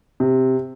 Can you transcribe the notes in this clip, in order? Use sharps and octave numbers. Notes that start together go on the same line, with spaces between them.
C3